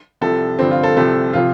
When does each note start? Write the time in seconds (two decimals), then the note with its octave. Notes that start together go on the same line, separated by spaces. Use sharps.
0.21 C2 C3 F3 A4
0.59 G2 D3 F3 C4
0.71 F4
0.83 A4
0.96 C2 C3 F3 A4
1.33 C3 F3 F4